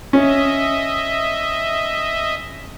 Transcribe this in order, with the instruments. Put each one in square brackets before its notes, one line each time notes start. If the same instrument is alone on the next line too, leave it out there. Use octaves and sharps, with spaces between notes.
[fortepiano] C#4 [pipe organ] D#5 E5